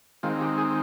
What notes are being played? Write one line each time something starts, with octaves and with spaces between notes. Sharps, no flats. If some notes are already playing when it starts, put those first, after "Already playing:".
D#3 G#3 C4 F4
G4
G#4